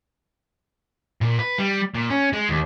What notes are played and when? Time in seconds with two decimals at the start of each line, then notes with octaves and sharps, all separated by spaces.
1.21 A#2
1.39 B4
1.58 G3
1.95 A#2
2.10 C#4
2.33 G#3
2.49 D#2